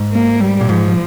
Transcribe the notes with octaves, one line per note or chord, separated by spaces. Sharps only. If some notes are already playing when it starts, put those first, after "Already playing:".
Already playing: G#2
A#3
G3
A#2
G#2 F3